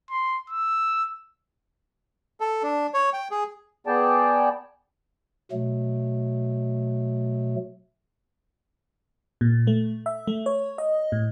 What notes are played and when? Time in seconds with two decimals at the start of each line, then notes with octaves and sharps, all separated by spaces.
0.10 C6
0.50 E6
2.40 A4
2.63 D4
2.94 C#5
3.13 G5
3.31 G#4
3.87 B3 G#4 D5 G5 A5
5.52 B2 F#3 A3
9.41 A#2
9.67 A3
10.06 E5
10.27 A3
10.46 C#5
10.78 D#5
11.12 A2